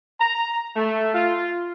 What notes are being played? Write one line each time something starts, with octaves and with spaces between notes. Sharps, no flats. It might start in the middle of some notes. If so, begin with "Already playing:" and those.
A#5
A3
F4